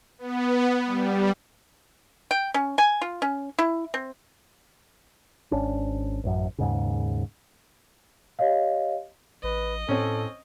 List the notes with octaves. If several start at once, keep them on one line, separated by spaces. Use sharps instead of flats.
B3
G3
G5
C#4
G#5
F4
C#4
E4
C4
G#1 C#4 D4
A1 F#2
D#2 G#2 C#3
G4 C#5 D#5 F5
A1 B4 D#5
A2 C4 C#4 A4